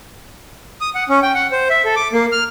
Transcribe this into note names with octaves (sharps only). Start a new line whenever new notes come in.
D#6
F#5
C#4
G5
F#5
C5
E5
A4
D6
A#3
F6